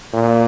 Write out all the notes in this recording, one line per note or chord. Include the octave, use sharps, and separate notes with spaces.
A#2